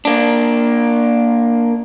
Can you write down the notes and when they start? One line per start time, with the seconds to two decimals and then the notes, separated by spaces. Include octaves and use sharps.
0.05 A#3 D4